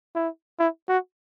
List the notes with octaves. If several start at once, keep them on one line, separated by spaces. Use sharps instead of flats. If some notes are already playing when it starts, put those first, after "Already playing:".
E4
E4
F#4